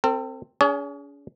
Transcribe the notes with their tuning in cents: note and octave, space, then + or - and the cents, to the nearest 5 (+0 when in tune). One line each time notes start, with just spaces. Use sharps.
C4 +0 A4 +45
C#4 +45 G#4 +0 C#5 +40